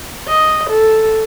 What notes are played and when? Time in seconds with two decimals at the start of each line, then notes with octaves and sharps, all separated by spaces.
0.28 D#5
0.69 A4